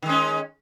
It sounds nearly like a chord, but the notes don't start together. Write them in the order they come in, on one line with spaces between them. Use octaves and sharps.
D#3 G#3 C#4